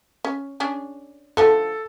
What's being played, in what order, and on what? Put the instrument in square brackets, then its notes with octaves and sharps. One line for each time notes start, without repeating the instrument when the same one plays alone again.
[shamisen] C#4
C#4 D4 G#4
[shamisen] D3 F3 A3 [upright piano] A4